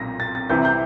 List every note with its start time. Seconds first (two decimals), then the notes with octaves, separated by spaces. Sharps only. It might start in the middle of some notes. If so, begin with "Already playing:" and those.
Already playing: B1 A#2 A#6
0.20 A6
0.35 A6
0.49 C2 C3 E3 G6
0.65 G6